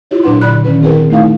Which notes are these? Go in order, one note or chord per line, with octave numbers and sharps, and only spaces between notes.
E4 F4 G4 C#5 D#5
A#2 F#3 D4 B4 F#5 C6
D3 D5 B5 F#6
D#3 C#4 B4
C4 E4 G#4 A#4 B4
A3 D#4 E4 F5